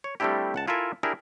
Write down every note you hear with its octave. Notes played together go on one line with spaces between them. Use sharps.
C#5
G3 A3 C4 D4 E4 G4
C#2 F#5 A5
E4 F4 A4 A#4 E5 G#5
D4 E4 G4 G#4 A#4